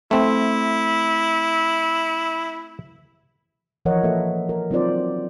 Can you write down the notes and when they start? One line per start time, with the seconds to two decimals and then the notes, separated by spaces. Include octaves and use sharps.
0.11 A3 C4 E4
3.85 E3 F3 A#4 C#5 D#5 F#5
4.03 A#3 A4 B4 E5
4.49 A#4
4.71 F#3 C4 D#4 F4 C5 D5